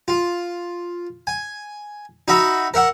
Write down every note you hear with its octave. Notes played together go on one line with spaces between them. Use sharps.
F4
G#5
D#4 F#4 E5 B5
A#4 E5 F#5